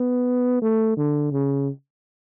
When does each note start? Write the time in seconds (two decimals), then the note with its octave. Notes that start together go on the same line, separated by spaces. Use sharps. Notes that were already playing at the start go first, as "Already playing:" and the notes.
Already playing: B3
0.62 A3
0.97 D3
1.32 C#3